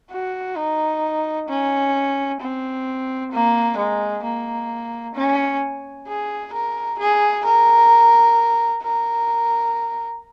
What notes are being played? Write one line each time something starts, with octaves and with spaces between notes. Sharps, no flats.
F#4
D#4
C#4
C4
A#3
G#3
A#3
C#4
G#4
A#4
G#4
A#4
A#4